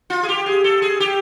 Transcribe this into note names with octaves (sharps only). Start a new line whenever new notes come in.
F4
G#4
G4
G#4
A4
G#4
G4